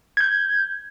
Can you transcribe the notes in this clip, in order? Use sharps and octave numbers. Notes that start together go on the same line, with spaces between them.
G6 G#6